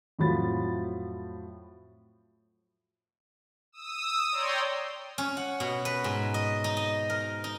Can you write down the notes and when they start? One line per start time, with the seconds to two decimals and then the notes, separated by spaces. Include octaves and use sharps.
0.19 F2 A2 F3 F#3 B5 A6
3.72 D#6 E6
4.31 C#5 D5 G5 A#5 C6
5.18 C#4
5.37 F#5
5.60 B2
5.85 B4
6.04 G#2
6.34 D#5
6.64 D#4
6.77 D#5
7.10 A#4
7.44 D#4